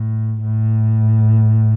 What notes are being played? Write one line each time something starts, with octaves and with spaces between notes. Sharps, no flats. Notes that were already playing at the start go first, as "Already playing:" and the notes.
Already playing: A2
A2